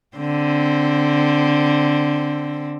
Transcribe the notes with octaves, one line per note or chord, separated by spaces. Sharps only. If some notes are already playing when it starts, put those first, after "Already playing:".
D3 C4